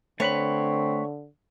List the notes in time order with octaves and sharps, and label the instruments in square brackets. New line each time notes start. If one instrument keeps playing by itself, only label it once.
[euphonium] D3 [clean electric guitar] A3 B4 B5 [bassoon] C4 [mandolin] C#5